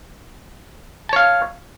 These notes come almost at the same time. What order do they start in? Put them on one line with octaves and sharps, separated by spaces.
A5 C#5 F5